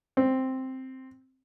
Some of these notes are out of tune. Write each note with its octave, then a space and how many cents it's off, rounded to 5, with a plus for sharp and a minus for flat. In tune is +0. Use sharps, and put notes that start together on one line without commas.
C4 +0